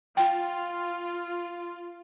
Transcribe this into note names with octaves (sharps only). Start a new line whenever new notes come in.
F4 G5